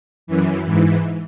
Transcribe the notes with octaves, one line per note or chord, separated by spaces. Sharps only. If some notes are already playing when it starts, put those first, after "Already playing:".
F#2 E3
G#2 E3